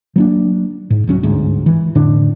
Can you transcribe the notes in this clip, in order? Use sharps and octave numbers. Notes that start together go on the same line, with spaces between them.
F#3 A#3 D4
G#2
C2 F#3 C#4
G1 D2 G#2
E3
F2 A2 D3 D4